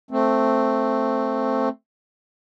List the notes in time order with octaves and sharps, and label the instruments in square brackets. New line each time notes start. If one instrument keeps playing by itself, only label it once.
[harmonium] A3 C4